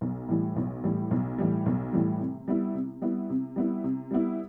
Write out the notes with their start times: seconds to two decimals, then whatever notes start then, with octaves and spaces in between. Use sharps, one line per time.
0.01 B1
0.29 A2 E3 G3
0.56 B1
0.84 A2 E3 G3
1.11 B1
1.38 A2 E3 G3
1.66 B1
1.93 A2 E3 G3
2.20 C3
2.48 G3 B3 E4
2.74 C3
3.02 G3 B3 E4
3.30 C3
3.56 G3 B3 E4
3.84 C3
4.11 G3 B3 E4